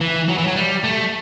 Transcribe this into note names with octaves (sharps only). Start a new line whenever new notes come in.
E3
F#3
E3
F#3
G3
A3